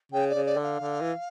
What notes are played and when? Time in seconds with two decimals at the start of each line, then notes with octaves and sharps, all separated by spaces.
0.12 C#3 G5
0.29 D5
0.35 C#3
0.46 D5
0.57 D3
0.63 F5
0.80 D3
1.01 E3